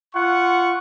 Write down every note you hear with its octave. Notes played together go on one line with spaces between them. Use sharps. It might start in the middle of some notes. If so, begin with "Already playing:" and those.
F4 F#5 C#6